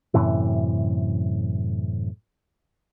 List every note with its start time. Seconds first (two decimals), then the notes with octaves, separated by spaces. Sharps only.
0.14 F#2 A2 C3 E3